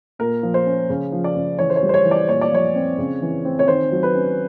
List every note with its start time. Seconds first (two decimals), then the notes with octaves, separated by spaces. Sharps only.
0.19 A#2 A#4
0.43 F3
0.54 C5
0.66 C#4
0.90 C#3
1.12 F3
1.24 D5
1.36 C#3
1.59 E3 C#5
1.70 C5
1.76 C#5
1.82 G3
1.89 C5
1.94 C#5
2.05 E3
2.11 D5
2.28 A#2 C#5
2.41 D5
2.51 F3 C#5
2.75 C4
2.98 C#3
3.22 E3
3.45 C4
3.59 C#5
3.68 D#3 C5
3.91 F#3
4.03 B4
4.14 C#4